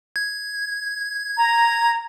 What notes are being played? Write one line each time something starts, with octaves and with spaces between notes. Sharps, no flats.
G#6
A#5